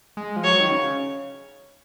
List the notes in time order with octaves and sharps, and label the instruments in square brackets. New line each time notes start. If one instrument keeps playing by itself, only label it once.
[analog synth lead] G#3
F3
[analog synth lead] F#3 [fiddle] C#5
[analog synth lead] D#3
C#3